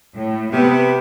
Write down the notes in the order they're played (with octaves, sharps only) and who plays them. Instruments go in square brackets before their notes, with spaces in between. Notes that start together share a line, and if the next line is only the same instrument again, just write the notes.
[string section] A2
[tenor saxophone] C3 [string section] B3